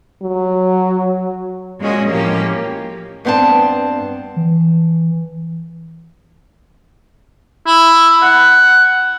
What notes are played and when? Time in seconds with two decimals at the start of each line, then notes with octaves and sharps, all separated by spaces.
0.22 F#3
1.81 A#2 G#3 C#4 F#4 D#5
2.10 A2 F3 A#3 C#4 G4
3.25 G2 B3 C4 D5 A5
4.36 E3
7.67 E4
8.22 F#5